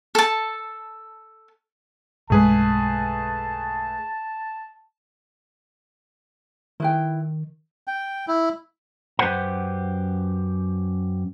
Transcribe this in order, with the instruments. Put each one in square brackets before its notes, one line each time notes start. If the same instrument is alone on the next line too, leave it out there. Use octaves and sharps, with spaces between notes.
[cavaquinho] A4 A5
[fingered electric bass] B1 G2 G#3 [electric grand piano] A3 G#4 B4 [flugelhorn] A5
[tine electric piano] D#3 [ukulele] E4 B4 G5
[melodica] G5
E4
[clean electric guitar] F#2 G4 B4 C5 F#5 A#5